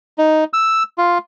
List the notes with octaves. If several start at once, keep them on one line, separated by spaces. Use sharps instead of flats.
D#4
E6
F4